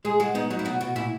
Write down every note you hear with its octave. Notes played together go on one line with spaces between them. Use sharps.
G#3 G#4
G#3 F#4
B3 D#4
F#3 D#4
E4
B2 F#4
B2 F#4
A#2 E4